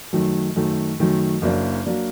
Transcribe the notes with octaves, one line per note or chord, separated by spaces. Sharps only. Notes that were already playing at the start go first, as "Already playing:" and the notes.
F#2 D#3 F#3 A3
F#2 D#3 F#3 A3
F#2 D#3 F#3 A3
F#1 F#2 F#3 A#3 D4
F#3 A#3 D4